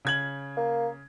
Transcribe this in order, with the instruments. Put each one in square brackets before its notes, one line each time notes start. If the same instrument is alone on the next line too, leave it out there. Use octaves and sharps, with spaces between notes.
[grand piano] C#3 G#6 F#7
[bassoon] A#3